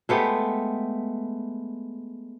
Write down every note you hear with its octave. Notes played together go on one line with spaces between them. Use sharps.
G#3 A3 B3 G4